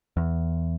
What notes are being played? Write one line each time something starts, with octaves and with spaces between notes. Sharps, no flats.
E2